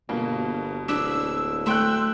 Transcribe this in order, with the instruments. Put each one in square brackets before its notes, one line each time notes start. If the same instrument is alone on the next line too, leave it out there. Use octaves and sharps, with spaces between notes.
[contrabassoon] G1 [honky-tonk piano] B2 A#3
[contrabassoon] D1 [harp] D4 [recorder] E6
[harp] A3 G5 [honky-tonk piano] C6 F#6 [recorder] E6